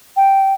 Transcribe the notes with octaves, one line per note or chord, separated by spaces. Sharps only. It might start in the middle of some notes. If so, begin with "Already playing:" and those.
G5